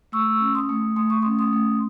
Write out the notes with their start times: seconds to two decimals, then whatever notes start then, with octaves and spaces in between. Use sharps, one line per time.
0.12 A3 C#6 E6
0.41 C#4
0.55 C6 D#6
0.69 A3
0.96 A3 D#6
1.10 C#6
1.22 C#4 C6 D#6
1.39 C6 D#6
1.53 A3